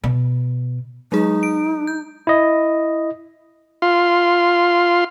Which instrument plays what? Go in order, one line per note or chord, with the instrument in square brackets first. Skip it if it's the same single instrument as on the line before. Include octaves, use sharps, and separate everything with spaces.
[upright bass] B2
[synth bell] F#3 G#3 G#4 [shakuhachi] D#4
[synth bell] D7
G6
[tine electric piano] E4 D#5
[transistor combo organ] F4 C6